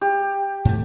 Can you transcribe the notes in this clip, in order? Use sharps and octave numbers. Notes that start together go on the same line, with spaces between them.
G4
G#2 A3